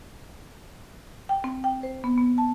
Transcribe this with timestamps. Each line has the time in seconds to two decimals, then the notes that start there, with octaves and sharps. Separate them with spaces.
1.29 G5
1.44 C4
1.64 G5
1.83 C5
2.04 B3
2.18 B3
2.38 A5